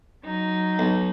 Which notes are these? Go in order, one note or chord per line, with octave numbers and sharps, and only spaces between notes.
F#3 D#4
B1